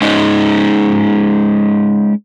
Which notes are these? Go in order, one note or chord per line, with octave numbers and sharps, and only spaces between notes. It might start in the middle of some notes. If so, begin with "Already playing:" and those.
G#3 C#4 D#4